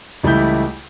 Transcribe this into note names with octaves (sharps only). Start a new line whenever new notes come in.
C#2 E3 G3 A3 E4 G6